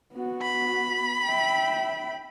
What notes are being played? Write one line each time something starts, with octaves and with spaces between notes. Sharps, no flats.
B3 F#4
B5
E5 G5